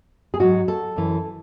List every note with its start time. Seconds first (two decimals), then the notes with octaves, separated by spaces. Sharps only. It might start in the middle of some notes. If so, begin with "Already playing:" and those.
0.34 G#4
0.40 G#2 F#3 F#4
0.68 A4
0.96 F#2 E3